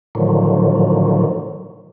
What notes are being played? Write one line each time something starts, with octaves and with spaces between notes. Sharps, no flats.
A2 D3 D#3 F3 F#3